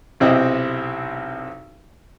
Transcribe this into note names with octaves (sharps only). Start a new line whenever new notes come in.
B1 C3 C4 E4 D#5